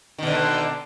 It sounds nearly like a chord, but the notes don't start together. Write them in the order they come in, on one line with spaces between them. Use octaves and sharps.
D#3 B2 D3